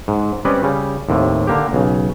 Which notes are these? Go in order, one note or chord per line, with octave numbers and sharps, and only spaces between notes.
G#2
G3 C4 C#4 B4 D5 D#5
C#3 G3
D#2 A2 C3
D3 A#3 G4
B1 C#3